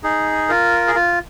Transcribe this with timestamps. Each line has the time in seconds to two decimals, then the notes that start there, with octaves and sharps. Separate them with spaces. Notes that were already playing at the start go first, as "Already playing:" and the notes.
0.04 D#4 G#4
0.49 F4 A#4
0.87 G#4
0.95 F4